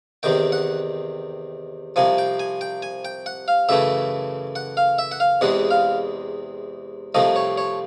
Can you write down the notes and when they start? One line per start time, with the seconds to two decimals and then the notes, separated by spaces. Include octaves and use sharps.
0.23 E2 C3 D#3 G5
0.52 F#5
1.96 C2 C3 F3 G#5
2.18 G5
2.39 G#5
2.61 G5
2.82 G#5
3.05 G5
3.26 F#5
3.48 F5
3.69 F#2 C#3 E3 A3 E5
4.56 F#5
4.77 F5
4.99 E5
5.12 F#5
5.20 F5
5.41 E2 C3 E3 G#3 F#5
5.71 F5
7.14 C2 C3 F3 A3 D#5
7.36 C#5
7.58 C#5